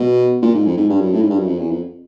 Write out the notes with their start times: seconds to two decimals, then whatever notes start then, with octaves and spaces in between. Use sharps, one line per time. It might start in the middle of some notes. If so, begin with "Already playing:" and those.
Already playing: B2
0.42 A#2
0.54 G#2
0.66 F2
0.77 G#2
0.90 G2
1.01 F#2
1.13 A2
1.22 G#2
1.30 G2
1.39 F#2
1.48 F2
1.59 E2
1.71 F2